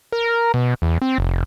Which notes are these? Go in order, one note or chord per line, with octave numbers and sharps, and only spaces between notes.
A#4
B2
E2
C4
F1